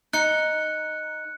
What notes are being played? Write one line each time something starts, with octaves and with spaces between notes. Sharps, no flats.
D#4 F#6 C#7